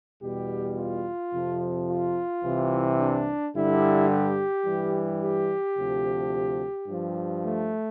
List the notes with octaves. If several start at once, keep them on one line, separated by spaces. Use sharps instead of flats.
E2 B2 G3 G4
F4
F2 C3 F3
F4
C2 C3 E3
D4
G2 D3 G3 E4
G4
G2 E3 G3
G4
D2 C3 F3
G2 F3
A3